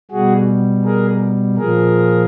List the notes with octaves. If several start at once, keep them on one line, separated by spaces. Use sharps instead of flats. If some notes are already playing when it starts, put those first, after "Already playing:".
B2 G3 F#4 G#4
G#4 A#4
A#2 F3 G#4 A#4